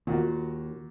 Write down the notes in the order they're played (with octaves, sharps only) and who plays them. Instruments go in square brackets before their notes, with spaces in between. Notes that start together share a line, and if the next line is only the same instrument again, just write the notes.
[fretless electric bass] D#2 [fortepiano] A#2 F#4 [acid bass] D#3